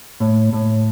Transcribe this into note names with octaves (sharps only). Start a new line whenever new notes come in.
A2
A2